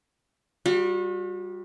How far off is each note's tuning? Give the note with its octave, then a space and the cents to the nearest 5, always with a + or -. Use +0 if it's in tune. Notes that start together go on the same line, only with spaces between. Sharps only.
G3 +0 F#4 -40